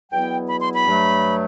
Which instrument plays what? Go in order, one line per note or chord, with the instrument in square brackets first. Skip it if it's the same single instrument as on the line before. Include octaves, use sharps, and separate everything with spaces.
[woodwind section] E2 B2 F#3 B3 E4 G5
B5
C6
B5
G2 F#3 A3